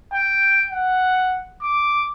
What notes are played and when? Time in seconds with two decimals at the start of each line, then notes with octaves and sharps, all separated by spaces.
0.14 G5
0.71 F#5
1.62 D6